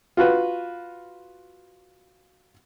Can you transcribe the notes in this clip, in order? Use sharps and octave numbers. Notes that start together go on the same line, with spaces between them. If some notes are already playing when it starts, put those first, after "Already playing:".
F4 F#4 B4